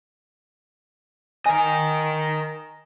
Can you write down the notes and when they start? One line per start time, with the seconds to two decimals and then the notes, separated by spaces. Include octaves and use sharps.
1.46 A#4 D#5 G#5